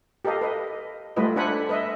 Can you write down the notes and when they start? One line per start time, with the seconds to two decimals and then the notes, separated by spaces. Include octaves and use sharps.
0.25 G4 A4 A#4 D#5 F5
0.41 B4 D#5
1.16 G3 A3 E4 F4 B4 D#5
1.36 D4 A4 C5 F#5 G#5 B5
1.69 B4 D#5 E5